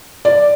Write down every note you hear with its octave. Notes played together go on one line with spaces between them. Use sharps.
D5